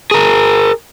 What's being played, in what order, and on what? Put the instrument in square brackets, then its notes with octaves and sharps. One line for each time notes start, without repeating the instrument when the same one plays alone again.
[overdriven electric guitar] G#4 A#4